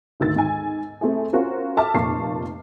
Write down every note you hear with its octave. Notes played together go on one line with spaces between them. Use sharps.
G#1 D2 D#3 E6 A6
G#2 G#5
A3 C4 E4 G#4
C#4 F4 F#4 A#4 C5
A4 E5 A5 D6 F6
F1 A#2 F4 A5 C#6 C7